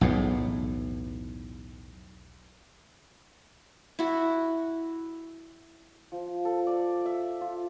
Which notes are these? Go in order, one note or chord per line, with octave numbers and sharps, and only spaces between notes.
B1 E2 A2
E4 F#4
F3
A4
D5
E5
F4